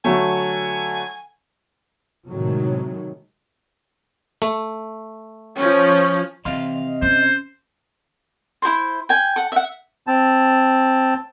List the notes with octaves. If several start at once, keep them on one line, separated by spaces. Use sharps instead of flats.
D3 F#3 A3 G#5
A2 C3 D#3 F#3 G#3 A3
A3
F3 C#4
C3 E3 D#5 F5 C6
C#4 C5
E4 G#4 C5 C6
G5 G#5
A4 F#5
E5 F#5
C4 A5